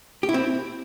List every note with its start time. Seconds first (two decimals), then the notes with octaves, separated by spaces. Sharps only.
0.23 G4
0.29 E4
0.34 C4